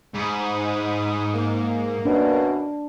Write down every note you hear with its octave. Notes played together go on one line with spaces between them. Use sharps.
G#2 B5 D#6
A#3
F#2 B2 D4